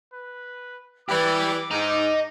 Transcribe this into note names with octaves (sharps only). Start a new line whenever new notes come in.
B4
E3 G4 D5 D6
G#2 D#5 A#5